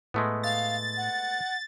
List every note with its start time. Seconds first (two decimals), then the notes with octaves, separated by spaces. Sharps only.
0.14 A2 G#3 A3 B3
0.43 F5 A6
0.97 F#5